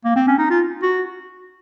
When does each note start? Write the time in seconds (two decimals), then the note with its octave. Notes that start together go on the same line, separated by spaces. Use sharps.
0.05 A#3
0.16 C4
0.28 C#4
0.38 D#4
0.50 F4
0.82 F#4